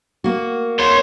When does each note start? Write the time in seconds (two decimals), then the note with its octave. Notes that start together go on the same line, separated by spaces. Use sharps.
0.24 A#3 F#4
0.80 C#5 C6